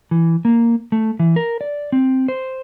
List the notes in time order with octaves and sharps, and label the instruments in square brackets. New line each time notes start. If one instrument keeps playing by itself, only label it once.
[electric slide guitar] E3
A#3
A3
E3
A#4
D5
C4
C5